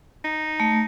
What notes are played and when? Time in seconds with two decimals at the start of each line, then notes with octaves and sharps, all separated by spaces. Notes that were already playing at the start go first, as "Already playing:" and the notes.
0.24 D#4
0.60 A3